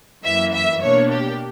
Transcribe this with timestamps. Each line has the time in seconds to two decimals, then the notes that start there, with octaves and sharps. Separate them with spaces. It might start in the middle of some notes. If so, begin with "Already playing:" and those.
0.24 F#2 E3 A#3 E5
0.53 E5
0.82 B2 A#3 D4 C#5
1.11 G4